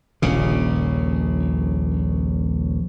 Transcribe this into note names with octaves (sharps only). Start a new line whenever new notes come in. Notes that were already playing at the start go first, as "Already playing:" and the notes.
D#1 A#1 C#3